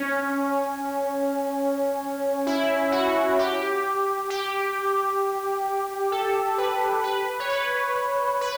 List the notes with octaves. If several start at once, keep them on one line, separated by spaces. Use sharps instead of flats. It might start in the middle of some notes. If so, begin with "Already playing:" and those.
Already playing: C#4
E4
F#4
G4
G4
A4
B4
B4
C#5
B4
B4